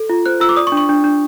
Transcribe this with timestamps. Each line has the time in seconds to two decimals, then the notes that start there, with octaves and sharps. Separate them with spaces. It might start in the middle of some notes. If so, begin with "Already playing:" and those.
Already playing: A4
0.09 F4
0.26 C5 F#6
0.40 F4 E6
0.49 D6
0.57 D5 D#6
0.67 C#6
0.72 D4
0.77 C#6
0.89 D4
1.04 D4